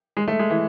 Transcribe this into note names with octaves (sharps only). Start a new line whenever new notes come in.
G#3
A3
G#3
E3